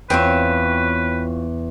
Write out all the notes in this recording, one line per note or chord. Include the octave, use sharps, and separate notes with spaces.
E2 C4 F4 B4 C#5